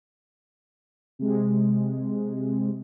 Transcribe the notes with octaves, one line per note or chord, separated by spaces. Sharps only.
C3 G#3